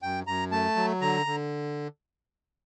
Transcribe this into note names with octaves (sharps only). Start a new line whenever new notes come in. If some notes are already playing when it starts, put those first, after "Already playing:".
F#2 G5
F#2 A#5
A3 A5
F#3
D3 A#5
D3